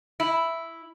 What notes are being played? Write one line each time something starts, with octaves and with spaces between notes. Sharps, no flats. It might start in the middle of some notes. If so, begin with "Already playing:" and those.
E4